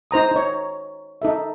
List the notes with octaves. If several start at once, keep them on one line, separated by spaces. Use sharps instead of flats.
D#4 C5 A#5 D#6
D#4 C#5
D#4 A4 E5